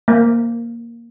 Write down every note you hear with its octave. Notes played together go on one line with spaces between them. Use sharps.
A#3